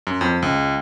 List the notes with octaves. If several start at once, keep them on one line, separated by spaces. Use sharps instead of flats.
F#2
F2
C#2